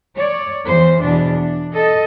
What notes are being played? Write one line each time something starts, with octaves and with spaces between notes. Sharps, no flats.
C#5 D5
E2 C5
E2 B2 D4
D4
A4 D#5